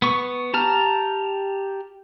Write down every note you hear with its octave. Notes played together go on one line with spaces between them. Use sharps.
B3 C#6
G4 A5 A#5 F6